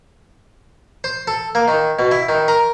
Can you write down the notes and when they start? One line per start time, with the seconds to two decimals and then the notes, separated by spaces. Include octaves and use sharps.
1.04 C5
1.28 A4
1.55 A#3
1.68 D#3
1.99 B2
2.11 E4
2.29 D#3
2.48 A#4